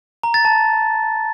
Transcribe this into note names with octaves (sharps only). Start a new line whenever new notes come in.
A#5
A6
A5